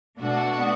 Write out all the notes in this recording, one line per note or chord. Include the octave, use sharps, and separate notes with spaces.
B2 A3 D4 F#4
B3